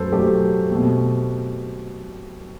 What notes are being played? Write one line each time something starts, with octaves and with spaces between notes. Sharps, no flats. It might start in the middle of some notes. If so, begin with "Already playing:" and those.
Already playing: F#2 F#3 A3 A4 B4 C5
F#2 F#3 A3 G4
B2 A3 C4